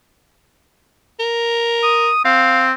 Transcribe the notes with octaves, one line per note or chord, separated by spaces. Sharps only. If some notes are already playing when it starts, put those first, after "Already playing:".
A#4
D#6
C4 F5